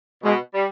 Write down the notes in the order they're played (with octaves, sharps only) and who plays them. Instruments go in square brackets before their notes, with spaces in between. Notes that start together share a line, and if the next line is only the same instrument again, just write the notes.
[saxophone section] B2 [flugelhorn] G#3
[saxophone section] G3